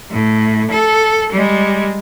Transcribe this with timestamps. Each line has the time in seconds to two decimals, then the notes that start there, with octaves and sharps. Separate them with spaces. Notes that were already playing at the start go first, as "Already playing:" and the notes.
0.11 A2
0.71 A4
1.33 G3 G#3